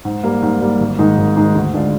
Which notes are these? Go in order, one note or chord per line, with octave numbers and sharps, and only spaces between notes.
G#2
G3 A#3
G#2
G3 A#3
G#1
G#2 D#3 G#3 D#4
G#1
G#2 D#3 G#3 D#4
D2
D3 G#3 D4 F4